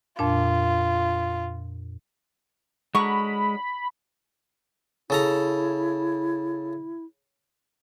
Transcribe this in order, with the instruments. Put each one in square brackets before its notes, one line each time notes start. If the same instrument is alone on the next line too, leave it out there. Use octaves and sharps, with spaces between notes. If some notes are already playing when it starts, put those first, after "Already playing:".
[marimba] F2 A#2 D4 [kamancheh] F4
[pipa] D3 F#3 C#6 [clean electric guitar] G#3 [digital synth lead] B5
[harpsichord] C#3 A4 A#5 [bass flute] E4